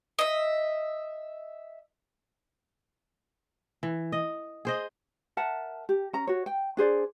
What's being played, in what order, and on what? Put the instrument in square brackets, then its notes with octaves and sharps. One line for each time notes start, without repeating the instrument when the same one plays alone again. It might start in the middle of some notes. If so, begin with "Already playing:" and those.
[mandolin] D#5 E5
[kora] E3
D#5
G#4 C5 D#5
[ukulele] A#4 E5 F#5 A5
G4
C#4 A#5
F#4 C#5
G5
D4 G#4 C5 D5